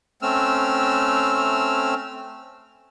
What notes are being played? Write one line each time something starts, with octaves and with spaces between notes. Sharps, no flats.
A3 C4 C#4 E6 F6